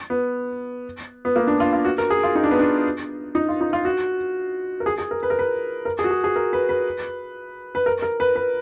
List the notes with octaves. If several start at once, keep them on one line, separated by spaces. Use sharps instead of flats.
B3
B3
A#3
D4
F4
F4
F#4
A#4
G#4
F4
D#4
D4
B3
D4
D#4
F4
D#4
F4
F#4
A#4
G#4
G#4
A#4
B4
A#4
B4
A#4
G#4
F#4
G#4
G#4
A#4
B4
B4
B4
A#4
A#4
B4
B4